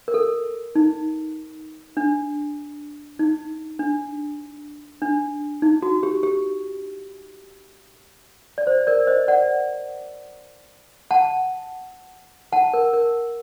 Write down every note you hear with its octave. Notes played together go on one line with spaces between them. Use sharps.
A#4
A4
D#4
D4
D#4
D4
D4
D#4
F#4
G4
G4
D5
C5
A#4 D5
C5 D#5
D5 F#5
F#5 A5
F#5 A5
A#4
A#4